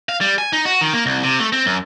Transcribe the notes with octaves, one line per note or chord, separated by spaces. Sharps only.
F5
G3
G#5
D#4
F#4
D#3
A#3
C2
C3
A3
C4
F#2